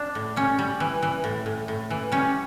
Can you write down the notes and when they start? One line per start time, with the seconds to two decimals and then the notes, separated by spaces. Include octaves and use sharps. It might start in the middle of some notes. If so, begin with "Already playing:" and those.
Already playing: D4
0.15 A2
0.36 G3 C#4
0.59 G3
0.80 E3
1.03 E3
1.24 A2
1.46 A2
1.68 A2
1.90 E3
2.12 G3 C#4